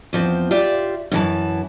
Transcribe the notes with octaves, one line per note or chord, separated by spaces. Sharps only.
E2 F3 C4
F4 G4 D5 E5
F#2 E3 A5